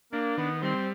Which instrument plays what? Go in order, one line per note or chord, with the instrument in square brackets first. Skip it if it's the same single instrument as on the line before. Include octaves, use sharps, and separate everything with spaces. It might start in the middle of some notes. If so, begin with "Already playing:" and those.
[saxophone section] A#3 [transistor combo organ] D4
[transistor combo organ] D#3 [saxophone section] B3
[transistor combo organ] G3 [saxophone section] C4